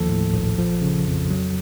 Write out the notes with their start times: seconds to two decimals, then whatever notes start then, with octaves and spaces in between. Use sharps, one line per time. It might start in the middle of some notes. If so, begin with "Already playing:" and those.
Already playing: D#2 F3 A4
0.09 A2
0.33 A#1
0.58 F3
0.82 C#3
1.07 F2
1.30 F#3